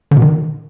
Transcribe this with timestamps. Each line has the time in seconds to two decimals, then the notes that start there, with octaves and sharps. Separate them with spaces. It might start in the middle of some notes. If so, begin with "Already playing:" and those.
0.11 D3
0.17 B2
0.22 D#3